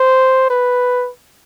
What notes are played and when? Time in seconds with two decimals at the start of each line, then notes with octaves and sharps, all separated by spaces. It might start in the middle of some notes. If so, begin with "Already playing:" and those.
Already playing: C5
0.50 B4